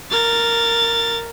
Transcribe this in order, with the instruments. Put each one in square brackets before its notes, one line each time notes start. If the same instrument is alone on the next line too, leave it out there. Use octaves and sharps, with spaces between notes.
[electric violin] A#4 A6